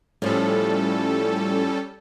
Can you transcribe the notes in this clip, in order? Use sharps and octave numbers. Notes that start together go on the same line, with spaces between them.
A2 F3 G3 C#4 A4